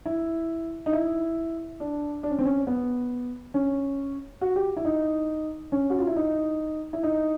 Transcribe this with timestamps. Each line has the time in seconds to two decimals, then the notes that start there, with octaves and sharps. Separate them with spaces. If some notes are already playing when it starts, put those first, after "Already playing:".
0.06 E4
0.86 D#4
0.93 E4
1.80 D4
2.23 D4
2.31 C#4
2.39 C4
2.45 C#4
2.67 B3
3.54 C#4
4.41 F#4
4.56 G4
4.77 E4
4.85 D#4
5.72 C#4
5.90 F#4
5.99 F4
6.07 E4
6.16 D#4
6.93 E4
7.03 D#4